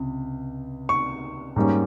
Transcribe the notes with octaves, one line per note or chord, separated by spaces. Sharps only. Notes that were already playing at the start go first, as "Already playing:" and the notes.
Already playing: C#2 C3
C#6
G#2 G3 A#3 C#4